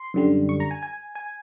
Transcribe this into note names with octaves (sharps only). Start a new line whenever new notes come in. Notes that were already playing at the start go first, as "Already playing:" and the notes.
Already playing: C6
F#2 D3 G3
C#6
A#5
G#5
G#5
G#5